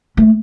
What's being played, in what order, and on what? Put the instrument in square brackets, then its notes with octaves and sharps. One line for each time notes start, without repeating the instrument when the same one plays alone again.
[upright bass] A3